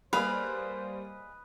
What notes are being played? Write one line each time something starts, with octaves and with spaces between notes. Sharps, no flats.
G3 A#3 G#4 B4 C5 D#5 F5 B5